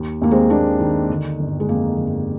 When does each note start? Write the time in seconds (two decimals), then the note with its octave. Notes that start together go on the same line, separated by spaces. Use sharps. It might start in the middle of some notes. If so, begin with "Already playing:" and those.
Already playing: D#2
0.22 D#2 A#3
0.31 G#3 C4
0.50 D#3 A#3 D4
0.80 D#3
1.09 D3
1.39 G1
1.60 G#3
1.68 F2 A#3
1.98 G1